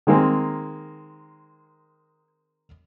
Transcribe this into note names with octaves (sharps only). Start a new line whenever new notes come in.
D#3 G#3 A#3 C4